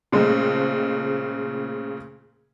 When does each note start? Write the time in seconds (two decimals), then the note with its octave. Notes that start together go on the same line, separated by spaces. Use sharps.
0.12 A#2 C#3 G#3 A3 C4